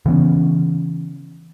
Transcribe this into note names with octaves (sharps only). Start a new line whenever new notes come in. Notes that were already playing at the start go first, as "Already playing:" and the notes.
C#3 E3 B3 C#4